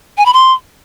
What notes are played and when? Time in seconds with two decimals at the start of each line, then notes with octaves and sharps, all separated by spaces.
0.18 G#5
0.26 B5
0.34 C6